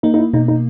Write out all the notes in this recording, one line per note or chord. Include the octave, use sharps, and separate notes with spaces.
A#3 D#4
D#4
E4
B2 D#4
D#4